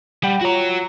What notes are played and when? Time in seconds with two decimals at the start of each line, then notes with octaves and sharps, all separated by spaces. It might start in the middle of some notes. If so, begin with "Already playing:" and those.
0.23 G3 F#5 G5 B5
0.41 F4 F#4 C#5 A#5